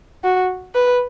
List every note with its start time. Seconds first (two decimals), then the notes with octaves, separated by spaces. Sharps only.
0.24 F#4
0.75 B4